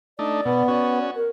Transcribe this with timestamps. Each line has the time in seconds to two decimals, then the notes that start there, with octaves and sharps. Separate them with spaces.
0.19 A3 D4 D#4 D5
0.45 B2 B3
0.68 C#4 F#4 D5
1.16 A#4